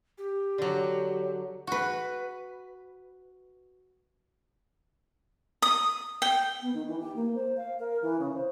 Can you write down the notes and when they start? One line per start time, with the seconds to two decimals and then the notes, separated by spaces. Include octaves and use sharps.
0.18 G4
0.58 D3 F#3
1.67 F#4 B4
5.62 D#6
6.22 G5
6.62 B3
6.74 D#3
6.87 E3
7.00 G4
7.16 A#3
7.35 C5
7.57 F5
7.79 A#4
8.02 E3
8.19 C#3
8.35 C5